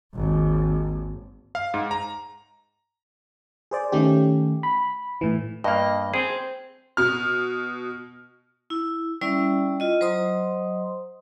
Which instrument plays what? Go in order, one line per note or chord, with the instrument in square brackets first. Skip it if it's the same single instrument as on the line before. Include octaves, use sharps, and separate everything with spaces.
[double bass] G#1 D#2
[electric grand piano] F5
G#2
A#5
[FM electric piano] G#4 C5 D5
D#3 A3 C#4 G4
B5
A2 E3
[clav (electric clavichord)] G2 A#3 [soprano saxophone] D#5
[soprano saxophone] C4 [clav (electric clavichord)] G#4
[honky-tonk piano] B2 F6
[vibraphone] E4
G3 C#4 E4 D5 E5
E4 F4 D#5
F#3 C5 D#5 A#5 C6 D#6